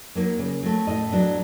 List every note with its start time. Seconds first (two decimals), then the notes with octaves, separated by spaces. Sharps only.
0.15 F#3 A#3 D#4
0.38 C#3
0.63 F#3 A3
0.87 A2 D#5
1.12 F#3 B3 D4